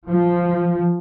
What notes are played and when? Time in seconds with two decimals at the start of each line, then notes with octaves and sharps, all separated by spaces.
0.08 F3